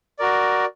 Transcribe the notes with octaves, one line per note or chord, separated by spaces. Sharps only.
F#4 A#4 D5